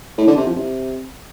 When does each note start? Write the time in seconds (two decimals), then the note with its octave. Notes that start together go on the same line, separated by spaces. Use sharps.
0.18 A2
0.27 D3
0.37 C3
0.47 F3
0.56 C3